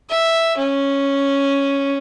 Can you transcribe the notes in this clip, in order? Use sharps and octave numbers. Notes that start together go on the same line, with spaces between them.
E5
C#4